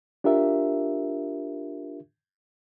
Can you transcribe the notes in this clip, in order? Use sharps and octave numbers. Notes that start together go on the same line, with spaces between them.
D4 F4 G4 A#4 E5